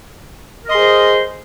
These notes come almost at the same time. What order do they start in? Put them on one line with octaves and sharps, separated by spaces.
A#4 D#5 C6 G#4 C5